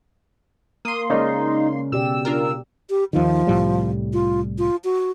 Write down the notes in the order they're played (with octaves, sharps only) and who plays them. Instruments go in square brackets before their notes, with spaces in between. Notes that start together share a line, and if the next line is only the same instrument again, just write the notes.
[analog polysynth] A#3 C6 [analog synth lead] D#6
[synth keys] C#3 [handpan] G#3 A#4 D5 [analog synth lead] D#4
[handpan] B2 G4 D5 [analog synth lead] E6
[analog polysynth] D4 F4 A#4
[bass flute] G4
[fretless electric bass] D#2 D#3 [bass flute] F3
[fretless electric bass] C2 A2 G3
[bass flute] F4
F4
F#4